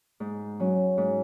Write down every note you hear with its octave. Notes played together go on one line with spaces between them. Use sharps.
G#2
F#3 C#4
G#2